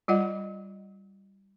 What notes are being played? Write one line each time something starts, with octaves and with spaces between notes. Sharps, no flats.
G3 F4 D5 D#5 F#5